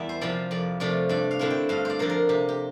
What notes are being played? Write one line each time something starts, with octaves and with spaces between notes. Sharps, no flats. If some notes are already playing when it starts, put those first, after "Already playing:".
Already playing: E2 G3 E4 E5
C5
C3 F3 C4 D5
F2 D5
C3 F3 A3 D5
G2 D5
F5
D3 A3 C4 E4
G5
G2 F5
C5 D5
D3 F3 A#3 A4
A#4
C3 G4
G4